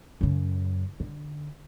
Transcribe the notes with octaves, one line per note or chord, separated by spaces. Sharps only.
F#2 C#3
D3